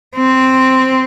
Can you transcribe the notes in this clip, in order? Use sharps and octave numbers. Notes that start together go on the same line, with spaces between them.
C4